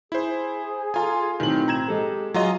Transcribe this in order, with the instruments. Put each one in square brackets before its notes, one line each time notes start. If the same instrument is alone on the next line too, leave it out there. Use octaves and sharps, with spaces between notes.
[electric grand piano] E4 C5 [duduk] G#4
[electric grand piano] F4 G#5 [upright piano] A4 A#5 C6
[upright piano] B1 A2 F#7 [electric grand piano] D#3 [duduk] C4
[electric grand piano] A#5 G#6 E7
[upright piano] G#3 A4 [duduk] G4
[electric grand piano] F#3 F4 D#5 [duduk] G#4 [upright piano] A#5